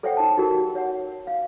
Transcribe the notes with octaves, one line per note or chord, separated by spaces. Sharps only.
A4 C5 C#5 E5 F#5 G5
D#4 A5
D#4 F#4 G4 A#4
C#5 F#5
F5